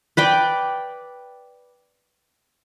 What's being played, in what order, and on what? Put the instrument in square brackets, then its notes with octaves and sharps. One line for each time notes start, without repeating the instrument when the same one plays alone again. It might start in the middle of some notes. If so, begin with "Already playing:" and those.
[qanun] B4 D5 G5